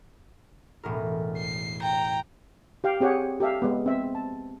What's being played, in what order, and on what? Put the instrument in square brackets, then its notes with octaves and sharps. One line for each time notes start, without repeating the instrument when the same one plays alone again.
[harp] E1 A2 A#4
[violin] C7
G5 A#5
[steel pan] G4 F5 G5
C4 G4 G#4 C#5 F#5
G4 A4 E5 F5
G#3 B3
C4 E5
A5